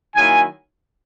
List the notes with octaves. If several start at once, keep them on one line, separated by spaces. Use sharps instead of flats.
D#3 F#3 A#3 E4 G#5